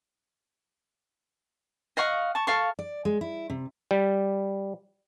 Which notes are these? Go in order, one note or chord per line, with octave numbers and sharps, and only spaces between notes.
D#5 F5 F#5 C#6
A5 C#6
A4 F5 C#6
D5
G#3
E4
C3
G3